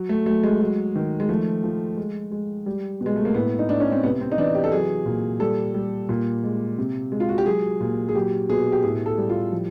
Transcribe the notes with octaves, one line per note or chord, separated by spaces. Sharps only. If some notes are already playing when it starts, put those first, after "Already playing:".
Already playing: F#3
A3
F#3 A3
G#3
F#3
D#3
G#3
F3 A3
F3
G#3
G#3
G3
B2
G#3
A3
A#3
A2 B3
D#4
A2 D4
C#4
C4
C3 B3
C4
D#4
E3 D4
G4
A4
F#3 G#4
A#2
G3 A4
G3
A#2
G#3
C3
G#3
F4
F#4
G4
F#3 G#4
A#2
G#4
F#3 G4
B2 G#4
G4
A2 G#4
A4
G3
F4
F3